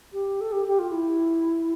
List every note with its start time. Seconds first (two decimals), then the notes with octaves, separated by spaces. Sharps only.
0.13 G4
0.41 A4
0.52 G4
0.67 G4
0.79 F4
0.91 E4